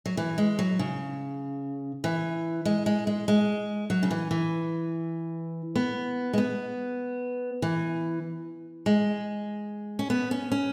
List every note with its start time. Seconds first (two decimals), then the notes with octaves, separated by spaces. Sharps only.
0.06 F#3
0.17 E3
0.38 G#3
0.59 F#3
0.79 C#3
2.04 E3
2.65 G#3
2.86 G#3
3.07 G#3
3.28 G#3
3.90 F#3
4.03 C#3
4.11 E3
4.31 E3
5.75 B3
6.33 G#3
6.38 B3
7.62 E3
8.86 G#3
9.99 C#4
10.10 B3
10.31 C#4
10.52 C#4